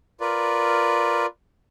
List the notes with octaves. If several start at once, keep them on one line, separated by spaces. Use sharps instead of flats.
F4 A#4 B4 D5